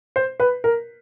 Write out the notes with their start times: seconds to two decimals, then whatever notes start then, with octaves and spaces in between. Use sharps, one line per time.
0.16 C5
0.40 B4
0.64 A#4